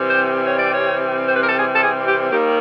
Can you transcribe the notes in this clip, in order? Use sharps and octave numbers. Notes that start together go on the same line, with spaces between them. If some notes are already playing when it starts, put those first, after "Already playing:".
Already playing: C3 E3 G3 C4
C5
C#5
D5
C#5
C5
B4
A#4
A4
G#4
A4
G#4
G4
D#2 D#3 G3 A#3 G4